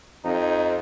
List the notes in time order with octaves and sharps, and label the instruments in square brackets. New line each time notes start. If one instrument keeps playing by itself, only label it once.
[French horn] F2 [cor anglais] D#4